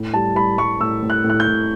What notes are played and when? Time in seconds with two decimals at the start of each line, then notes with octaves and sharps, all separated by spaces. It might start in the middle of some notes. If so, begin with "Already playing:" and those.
Already playing: A2
0.14 G3 A5
0.35 G3 B5
0.58 G3 C#6
0.80 A2 E6
1.02 A2
1.10 F#6
1.24 A2
1.30 F#6
1.40 G6
1.47 A2